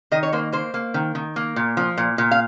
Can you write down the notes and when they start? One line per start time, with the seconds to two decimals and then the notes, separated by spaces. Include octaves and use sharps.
0.12 D#3 D#5
0.23 C#5
0.33 A#3 C5
0.52 A#3 C5
0.74 A#3
0.94 D#3
1.15 D#3
1.36 A#3
1.56 A#2
1.77 F3
1.97 A#2
2.18 A#2
2.31 F5